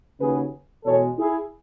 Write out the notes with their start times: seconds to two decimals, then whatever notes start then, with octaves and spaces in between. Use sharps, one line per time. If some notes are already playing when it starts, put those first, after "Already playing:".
0.20 D#2 C#3 F#3 G#4 B4
0.85 E2 B2 G#3 A4 C#5
1.18 E4 G#4